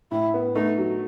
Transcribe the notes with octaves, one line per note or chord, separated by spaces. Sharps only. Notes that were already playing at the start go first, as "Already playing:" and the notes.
A2 E4
B3
A3 D#4
F#3